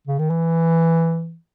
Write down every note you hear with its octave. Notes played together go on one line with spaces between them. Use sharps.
C#3
D#3
E3